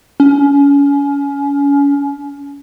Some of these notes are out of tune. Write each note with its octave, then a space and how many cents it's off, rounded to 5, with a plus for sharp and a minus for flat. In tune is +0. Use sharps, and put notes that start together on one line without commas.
C#4 +30